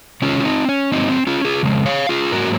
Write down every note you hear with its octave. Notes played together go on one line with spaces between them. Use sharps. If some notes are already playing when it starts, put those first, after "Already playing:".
C3 D#3 G#3 C#4 F4
F4
C4 D#4
C#4
G#2 F#3 A#3 C4 D#4
C4
C#4 F4
F4 G#4
F2 C#3 G#3
C#5 F5
F4 G#4
G#2 F#3 A#3 F#4 A#4